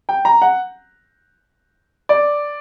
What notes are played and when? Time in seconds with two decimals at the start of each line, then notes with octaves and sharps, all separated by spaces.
0.09 G5
0.25 A#5
0.42 F#5
2.09 D5